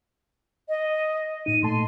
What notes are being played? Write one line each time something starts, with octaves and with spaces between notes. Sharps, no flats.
D#5
A2 D#4 D#7
A#2 A3 A5 C6